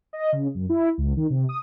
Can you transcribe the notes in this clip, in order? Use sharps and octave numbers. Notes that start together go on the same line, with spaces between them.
D#5
C#3
F#2
E4
C#2
D#3
C3
D#6